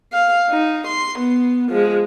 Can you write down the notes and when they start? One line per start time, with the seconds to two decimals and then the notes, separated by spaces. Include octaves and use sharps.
0.12 F5
0.50 D#4
0.87 C6
1.19 B3
1.69 F3 G#3